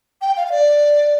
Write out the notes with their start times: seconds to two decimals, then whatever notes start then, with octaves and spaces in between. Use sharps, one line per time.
0.21 G5
0.37 F5
0.47 F5
0.52 D5